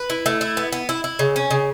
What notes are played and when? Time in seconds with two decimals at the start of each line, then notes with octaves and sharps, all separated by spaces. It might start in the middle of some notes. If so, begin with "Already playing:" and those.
Already playing: B4
0.10 E4
0.26 A3
0.41 E4
0.57 B3
0.72 B3
0.89 E4
1.04 E4
1.19 C#3
1.36 C#4
1.51 C#3